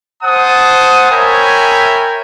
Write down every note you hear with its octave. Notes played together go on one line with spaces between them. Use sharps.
C5 F#5 A5 D#6
A#4 C#5 E5 G5 G#5 B5